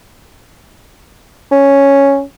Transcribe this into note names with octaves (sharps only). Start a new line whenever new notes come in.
C#4